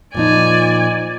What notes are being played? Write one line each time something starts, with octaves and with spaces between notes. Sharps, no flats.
A#2 F3 D#4 D5 G#5